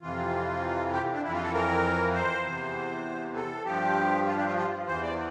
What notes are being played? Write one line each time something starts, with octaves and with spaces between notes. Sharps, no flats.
F2 C3 E3 F4
G4
D4
F2 E3 E4
F4
A4
A#4
C5
E2 C3 E3
A4
G2 F3 G4
F4
D4
F4
F4
E2 E3 C5
D5